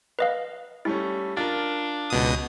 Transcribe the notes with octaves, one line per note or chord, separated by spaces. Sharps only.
B4 D#5 F5
G3 A3 C#4 E4
D4 F4 A#4 A6
C#2 B2 D#6